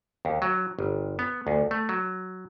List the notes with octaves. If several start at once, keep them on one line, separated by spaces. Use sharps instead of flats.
D#2
F#3
G1
B3
D2
A3
F#3